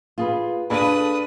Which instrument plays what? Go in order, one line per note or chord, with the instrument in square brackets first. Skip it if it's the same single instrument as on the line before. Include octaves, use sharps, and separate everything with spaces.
[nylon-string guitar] F4 G#4 B4
[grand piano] D4 B5 [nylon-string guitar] G#4 A4 F5 [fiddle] B4 D#6